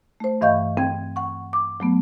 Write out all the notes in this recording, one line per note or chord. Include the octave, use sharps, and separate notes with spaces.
A3 C5
G2 E3 D#5 F5 C#6 G6
C4 G5 G#6
F#5 C#6
D6
F#3 A3 B3